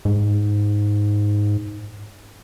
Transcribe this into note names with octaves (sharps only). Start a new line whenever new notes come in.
G#2